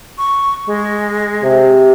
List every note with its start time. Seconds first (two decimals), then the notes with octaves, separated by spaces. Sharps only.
0.18 C#6
0.67 G#3
1.44 C3